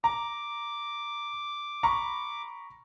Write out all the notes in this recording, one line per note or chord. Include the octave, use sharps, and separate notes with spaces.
A#5 D6
A#5 B5 C#6